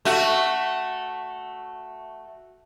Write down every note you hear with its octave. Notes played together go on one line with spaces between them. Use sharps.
A3 F#4